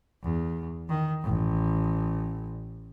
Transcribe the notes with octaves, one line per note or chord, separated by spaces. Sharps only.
E2
D#3
A1